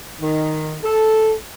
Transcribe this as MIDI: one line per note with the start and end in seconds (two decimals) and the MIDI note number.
0.21 0.75 51
0.83 1.32 69